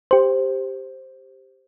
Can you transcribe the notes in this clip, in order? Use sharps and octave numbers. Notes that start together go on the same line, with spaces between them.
G4 C5